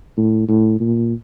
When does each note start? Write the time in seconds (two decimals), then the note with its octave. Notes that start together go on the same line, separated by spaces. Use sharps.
0.17 A2
0.48 A2
0.80 A#2